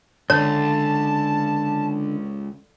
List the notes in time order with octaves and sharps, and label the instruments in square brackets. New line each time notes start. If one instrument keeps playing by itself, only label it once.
[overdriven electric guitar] C#2 [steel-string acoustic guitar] D3 [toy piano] C#5 [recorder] A5